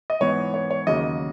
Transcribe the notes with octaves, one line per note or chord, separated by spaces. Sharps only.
D#5
G#2 E3 B3 C#5
C#5
C#5
D#2 C#3 F#3 A#3 D#5